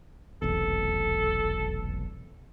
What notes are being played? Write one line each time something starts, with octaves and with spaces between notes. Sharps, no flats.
F1 B1 E2 A4